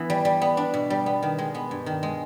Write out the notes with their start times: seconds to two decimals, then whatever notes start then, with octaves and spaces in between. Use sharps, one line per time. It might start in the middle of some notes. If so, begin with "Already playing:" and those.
Already playing: E3 B3
0.10 G3
0.25 G3
0.42 B3
0.57 D4
0.74 B2
0.90 G3
1.06 B3
1.23 D#3
1.39 G#3
1.55 B3
1.71 G2
1.86 D#3
2.03 G#3